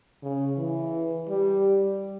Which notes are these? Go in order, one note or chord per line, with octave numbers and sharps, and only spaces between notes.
C#3
E3
G3